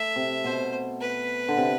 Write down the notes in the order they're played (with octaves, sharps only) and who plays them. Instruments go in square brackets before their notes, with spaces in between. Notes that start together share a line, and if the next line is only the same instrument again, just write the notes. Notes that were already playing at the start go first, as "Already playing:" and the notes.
Already playing: [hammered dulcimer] A3 [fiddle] E5
[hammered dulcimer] C3
[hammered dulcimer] B2 [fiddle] C5
[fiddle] B4
[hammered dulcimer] D3
C3